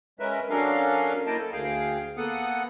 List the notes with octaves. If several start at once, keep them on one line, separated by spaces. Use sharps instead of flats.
G#3 C#4 A#4 B4 E5
F#3 C#4 D4 A4 A#4 F5
A#3 E4 A#4 D#5 G5 A5
A4
D2 G#4 F5 G5
A#3 B3 A4 F#5 D#6